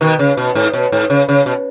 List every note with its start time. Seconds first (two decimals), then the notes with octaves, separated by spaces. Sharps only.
0.01 B2 D#3
0.19 C#3
0.37 B2
0.55 G#2
0.73 B2
0.92 G#2
1.10 C#3
1.28 C#3
1.46 B2